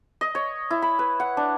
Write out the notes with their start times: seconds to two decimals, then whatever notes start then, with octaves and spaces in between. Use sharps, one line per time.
0.21 D#5
0.35 C#5
0.70 E4
0.82 B5
0.99 B4
1.20 F#5
1.37 D4